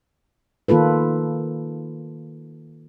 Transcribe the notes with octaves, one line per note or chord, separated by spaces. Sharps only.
D#3 A#3 F4 A4 B4